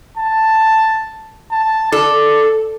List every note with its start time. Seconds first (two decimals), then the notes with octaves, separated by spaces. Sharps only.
0.17 A5
1.51 A5
1.92 A4 D5